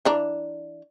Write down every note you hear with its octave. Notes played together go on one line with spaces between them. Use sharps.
E3 D4 A#5